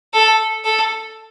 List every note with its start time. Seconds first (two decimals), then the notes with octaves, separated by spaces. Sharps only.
0.14 A4
0.64 A4